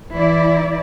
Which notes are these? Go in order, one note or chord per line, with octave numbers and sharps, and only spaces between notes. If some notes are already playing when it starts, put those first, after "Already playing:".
E3 E4 D5